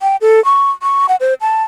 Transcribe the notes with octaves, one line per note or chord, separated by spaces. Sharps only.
G5
A4
C#6
C#6
F#5
C5
A5